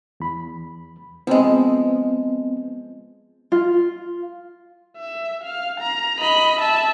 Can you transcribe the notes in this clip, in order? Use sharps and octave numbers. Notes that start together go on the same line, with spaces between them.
E2 B5
F3 G#3 B3 C4 D#5
F4
E5
F5
A#5
D#5 B5
E5 A5